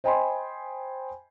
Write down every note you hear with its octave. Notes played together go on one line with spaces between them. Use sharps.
C5 D#5 G5 G#5 B5 C6